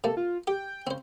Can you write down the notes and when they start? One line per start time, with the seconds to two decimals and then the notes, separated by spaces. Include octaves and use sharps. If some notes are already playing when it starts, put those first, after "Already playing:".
0.04 C3 A#3 A4
0.17 F4
0.47 G4 G5
0.87 C#3 C4 C5